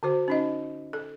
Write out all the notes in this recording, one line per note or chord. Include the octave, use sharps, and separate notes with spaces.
D3 F#4 C5
C#4 D#4 D#5
A4